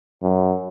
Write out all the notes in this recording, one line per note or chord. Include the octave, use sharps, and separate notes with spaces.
F#2